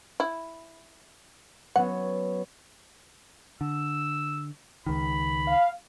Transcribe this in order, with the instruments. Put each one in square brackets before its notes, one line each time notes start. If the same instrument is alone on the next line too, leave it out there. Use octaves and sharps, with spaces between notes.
[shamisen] E4
[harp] F#3 B3 C#4 [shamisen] F#5
[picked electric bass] D3 [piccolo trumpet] E6
[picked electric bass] C#2 D#3 [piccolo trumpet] B5
[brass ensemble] F5